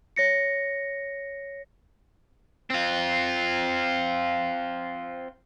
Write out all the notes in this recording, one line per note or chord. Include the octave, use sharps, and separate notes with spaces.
C#5 A#6 C#7
C4 F4